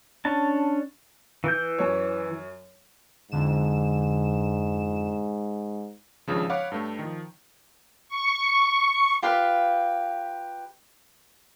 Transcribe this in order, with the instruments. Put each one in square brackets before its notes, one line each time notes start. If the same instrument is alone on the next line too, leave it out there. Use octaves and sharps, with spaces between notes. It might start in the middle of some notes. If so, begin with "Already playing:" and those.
[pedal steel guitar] C#4 D4 A5
E3 G6
[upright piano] F#2 C#5
[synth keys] F2 D3 E7 [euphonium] G#2
[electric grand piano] G#1 G2 C#3 F3
C#5 F5 F#5 B5 D6
G2 A3
D#3 F3
[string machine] C#6
[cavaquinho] F4 G4 B4 F5